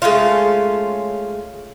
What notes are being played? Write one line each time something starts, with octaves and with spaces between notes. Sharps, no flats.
G#3 A3 C#4 F4